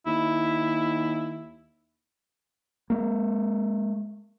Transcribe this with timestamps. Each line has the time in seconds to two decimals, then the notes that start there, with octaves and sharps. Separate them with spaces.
0.07 D#2 E4
2.90 G#3 A#3